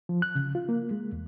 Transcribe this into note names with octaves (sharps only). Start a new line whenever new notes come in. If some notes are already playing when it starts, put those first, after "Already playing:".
F3
F#6
C#3
F4
A#3
G#3
E2